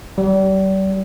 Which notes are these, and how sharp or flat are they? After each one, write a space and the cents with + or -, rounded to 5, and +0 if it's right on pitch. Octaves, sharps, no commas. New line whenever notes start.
G3 -35